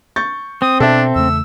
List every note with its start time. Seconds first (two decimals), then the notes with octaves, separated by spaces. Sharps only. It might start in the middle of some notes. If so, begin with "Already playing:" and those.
0.16 C#6 G6 A6
0.62 C4 D#6
0.80 B2 D4 A4 E5
1.15 E2 C#3 A3 E6